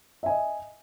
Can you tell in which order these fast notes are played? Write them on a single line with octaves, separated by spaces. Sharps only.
E5 G#5 D#5